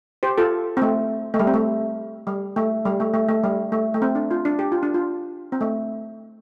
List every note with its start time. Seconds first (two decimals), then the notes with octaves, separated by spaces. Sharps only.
0.23 G4 C5
0.38 F4 A4
0.77 C4
0.82 A3
1.34 A3
1.39 G3
1.47 C4
1.54 A3
2.27 G3
2.56 A3
2.85 G3
3.00 A3
3.14 A3
3.29 A3
3.44 G3
3.72 A3
3.94 A3
4.02 C4
4.15 D4
4.31 F4
4.45 D4
4.59 G4
4.72 F4
4.83 D4
4.94 F4
5.52 C4
5.61 A3